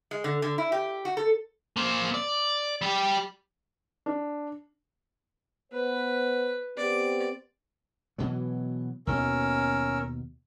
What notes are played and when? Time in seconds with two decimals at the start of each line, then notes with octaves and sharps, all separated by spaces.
0.11 G#3
0.24 D3
0.42 D3
0.58 E4
0.72 G4
1.05 F#4
1.17 A4
1.77 A#3 C5
2.14 D5
2.82 G3 G4
4.06 D4
5.73 B3 B4 C5
6.77 B3 C4 G4 D5
8.18 B2 E3 F#3
9.07 D#2 B2 C#4 A#4 E6